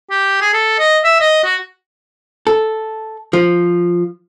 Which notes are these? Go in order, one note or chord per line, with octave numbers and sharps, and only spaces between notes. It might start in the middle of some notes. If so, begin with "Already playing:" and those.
G4
G#4
A4
D#5
E5
D#5
F#4
A4
F3